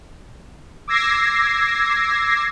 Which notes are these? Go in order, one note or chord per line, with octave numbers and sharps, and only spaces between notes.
D6 E6 G#6 A#6 C7